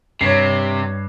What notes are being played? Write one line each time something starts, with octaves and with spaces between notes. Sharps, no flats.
G2 C3 C#5 C7